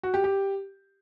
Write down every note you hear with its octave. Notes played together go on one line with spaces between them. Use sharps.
F#4
G4
G4